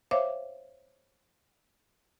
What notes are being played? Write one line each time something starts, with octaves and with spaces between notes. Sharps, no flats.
C5 C#5 E5 F5 D6